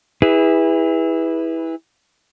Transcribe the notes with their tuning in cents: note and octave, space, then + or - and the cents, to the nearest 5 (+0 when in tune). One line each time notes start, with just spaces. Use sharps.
E4 -15 G#4 -35 B4 -5